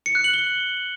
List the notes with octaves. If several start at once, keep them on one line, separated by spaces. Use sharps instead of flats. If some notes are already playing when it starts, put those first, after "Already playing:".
C#7
F#6
F#7
G7